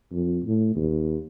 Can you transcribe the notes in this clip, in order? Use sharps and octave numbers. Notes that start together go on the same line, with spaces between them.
F2
A2
D#2